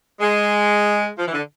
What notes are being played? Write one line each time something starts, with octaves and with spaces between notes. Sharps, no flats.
G#3
F3
E3
D3